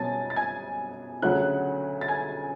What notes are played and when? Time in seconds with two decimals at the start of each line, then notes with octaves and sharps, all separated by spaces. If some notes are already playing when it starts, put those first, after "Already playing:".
Already playing: B2 F#3 C#4 G#5 A5 A6
0.30 A6
0.36 G#5 G#6
1.22 D2 C#3 F#3 A3 C#4 F#5 F#6
2.01 A6
2.08 G#5 G#6